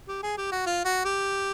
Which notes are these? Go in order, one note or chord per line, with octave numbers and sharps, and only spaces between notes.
G4
G#4
G4
F#4
F4
F#4
G4